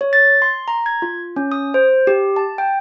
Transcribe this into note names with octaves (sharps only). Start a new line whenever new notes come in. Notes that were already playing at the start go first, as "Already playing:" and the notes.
C#5
A6
C6
A#5
G#6
F4
C#4
D#6
C5
G4
A5
G5